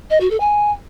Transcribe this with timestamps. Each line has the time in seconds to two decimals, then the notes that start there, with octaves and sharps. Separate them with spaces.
0.10 D#5
0.20 F#4
0.30 A4
0.40 G#5